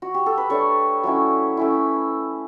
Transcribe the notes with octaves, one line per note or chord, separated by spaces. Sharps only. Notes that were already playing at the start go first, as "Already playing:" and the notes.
F#4
G4
A4
B4
A3 D4 A4 C#5
F#3 A3 C#4 E4
A3 C#4 E4